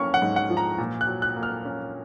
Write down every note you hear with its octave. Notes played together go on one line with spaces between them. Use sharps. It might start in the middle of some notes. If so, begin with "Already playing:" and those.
Already playing: A#3 C#4 C#6 F6
F#5
G#2
F#5
F3
A#5
A#2
F#6
F#3
F#6
A#3
F6
C#4